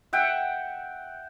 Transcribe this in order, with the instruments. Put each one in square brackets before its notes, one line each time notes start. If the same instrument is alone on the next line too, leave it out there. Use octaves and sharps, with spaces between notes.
[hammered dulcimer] E5 F#5 G5